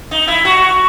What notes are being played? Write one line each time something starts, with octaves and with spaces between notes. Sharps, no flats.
D#4
E4
F#4